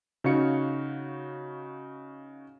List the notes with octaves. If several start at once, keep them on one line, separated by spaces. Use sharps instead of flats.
C#3 D#4 F#4 C#5 F5 C#7